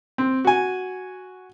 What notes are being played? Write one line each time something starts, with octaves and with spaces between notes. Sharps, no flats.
C4
F#4 G#5